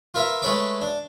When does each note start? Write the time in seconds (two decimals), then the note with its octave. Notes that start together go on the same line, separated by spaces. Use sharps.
0.14 F4 A#4 B4 E5
0.42 G#3 A3 B4 C#5 B5 D6
0.81 D4